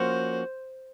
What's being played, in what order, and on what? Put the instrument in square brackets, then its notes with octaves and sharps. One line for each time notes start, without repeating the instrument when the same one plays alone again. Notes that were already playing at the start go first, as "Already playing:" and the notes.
Already playing: [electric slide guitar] F3 A#3 C#4 F#4 [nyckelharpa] C5